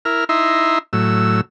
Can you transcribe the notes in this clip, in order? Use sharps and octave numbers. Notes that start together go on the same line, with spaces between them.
E4 A#4 F6
D#4 E4 E5 A#5 C6
A2 F#3 E6